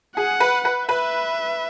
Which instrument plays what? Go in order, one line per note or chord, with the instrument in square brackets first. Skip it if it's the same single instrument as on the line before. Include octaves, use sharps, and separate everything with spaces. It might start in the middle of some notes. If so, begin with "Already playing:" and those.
[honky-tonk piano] G#4 [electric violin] F#5
[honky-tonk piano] B4
B4
[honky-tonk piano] B4 [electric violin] E5